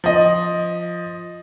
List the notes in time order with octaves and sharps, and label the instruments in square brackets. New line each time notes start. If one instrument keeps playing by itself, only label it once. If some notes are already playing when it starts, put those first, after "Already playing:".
[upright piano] F3 D#5